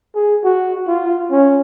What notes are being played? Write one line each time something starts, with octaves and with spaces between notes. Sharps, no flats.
G#4
F#4
F4
C#4